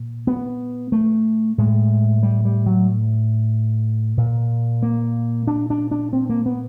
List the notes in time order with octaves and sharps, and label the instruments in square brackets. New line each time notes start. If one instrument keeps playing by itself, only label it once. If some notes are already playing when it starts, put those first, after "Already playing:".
Already playing: [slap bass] A#2
B3
A3
A2 G#3
G3
G3
F#3
A#2
A#3
D4
D4
D4
C4
A#3
B3